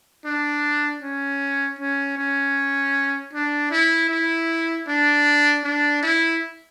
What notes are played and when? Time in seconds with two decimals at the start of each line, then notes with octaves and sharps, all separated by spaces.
0.25 D4
1.02 C#4
1.79 C#4
2.17 C#4
3.33 D4
3.71 E4
4.10 E4
4.87 D4
5.64 D4
6.03 E4